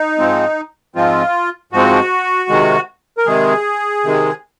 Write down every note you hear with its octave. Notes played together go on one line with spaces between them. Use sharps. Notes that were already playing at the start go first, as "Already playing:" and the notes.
Already playing: D#4
G#2 F3 G#3 C4
G#2 F3 G#3 C4 F4
G#2 F3 G#3 C4 F#4
C3 D#3 G#3
A#4
C3 D#3 G#3 G#4
C3 D#3 G#3